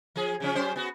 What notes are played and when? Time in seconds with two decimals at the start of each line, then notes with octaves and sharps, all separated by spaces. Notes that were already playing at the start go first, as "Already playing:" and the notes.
0.16 F3 G#4
0.40 C#3 F3 C#4
0.55 F#3 C#4 C5
0.76 B3 F#4